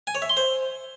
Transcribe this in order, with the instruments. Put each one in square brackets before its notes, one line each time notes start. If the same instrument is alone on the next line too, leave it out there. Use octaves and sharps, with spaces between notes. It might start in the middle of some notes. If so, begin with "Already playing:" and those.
[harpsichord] G#5
C#5
E5
C6
C5